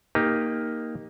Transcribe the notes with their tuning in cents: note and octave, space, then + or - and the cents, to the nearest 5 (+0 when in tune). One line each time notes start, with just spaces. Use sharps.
A#3 +0 D#4 +0 G4 +15